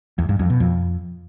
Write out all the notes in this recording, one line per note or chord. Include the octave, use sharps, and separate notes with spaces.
E2
G2
F2
B2
F2